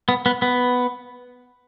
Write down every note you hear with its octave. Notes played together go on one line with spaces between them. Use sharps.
B3
B3
B3